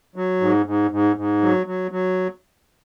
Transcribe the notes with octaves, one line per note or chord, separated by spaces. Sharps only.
F#3
G#2
G#2
G#2
G#2
F#3
F#3
F#3